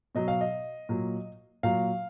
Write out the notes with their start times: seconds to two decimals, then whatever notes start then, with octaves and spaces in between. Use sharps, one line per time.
0.15 B2 F#3 D#5
0.28 F5
0.41 D#5
0.89 A#2 F#3
1.63 A#2 F#3 F5